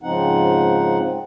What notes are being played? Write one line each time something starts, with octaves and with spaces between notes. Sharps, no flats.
G#2 C#3 F3 C4 D#4 F#5